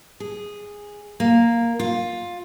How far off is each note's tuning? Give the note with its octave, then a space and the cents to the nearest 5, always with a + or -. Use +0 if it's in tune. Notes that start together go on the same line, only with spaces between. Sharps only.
G#4 -10
A#3 +0
F4 +15